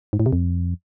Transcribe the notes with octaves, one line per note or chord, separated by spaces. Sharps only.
G#2
A2
C3
F2